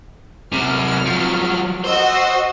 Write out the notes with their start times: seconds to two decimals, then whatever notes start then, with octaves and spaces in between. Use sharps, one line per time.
0.53 C3 F#3 F6
1.06 F3 F#3
1.84 F#4 C5 D#5 E6